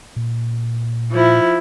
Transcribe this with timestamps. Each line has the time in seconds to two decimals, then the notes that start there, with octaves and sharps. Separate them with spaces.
0.16 A#2
1.11 F3 E4